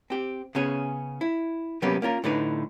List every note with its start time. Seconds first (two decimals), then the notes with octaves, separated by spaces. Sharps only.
0.10 C4 G4
0.55 C#3 B3 C#4 G#4
1.21 E4
1.82 C3 F#3 G3 A#3 B3 C#4
2.02 A#3 C#4 F4 A#4
2.24 A2 D3 D#4 B4